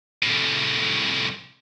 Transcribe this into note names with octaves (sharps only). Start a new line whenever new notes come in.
C2 A2